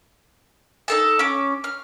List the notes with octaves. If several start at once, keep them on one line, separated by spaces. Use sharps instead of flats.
D#4 A4 A5
C#4 D6
F6